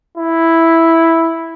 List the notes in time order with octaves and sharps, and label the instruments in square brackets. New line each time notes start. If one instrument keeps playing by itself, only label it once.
[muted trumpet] E4